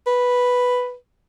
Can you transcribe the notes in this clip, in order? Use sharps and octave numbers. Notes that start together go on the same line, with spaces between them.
B4